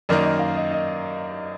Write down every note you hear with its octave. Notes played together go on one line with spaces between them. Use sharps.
F#2 D#3 A#3 D#4 D5
D#5
F5
D#5
D#5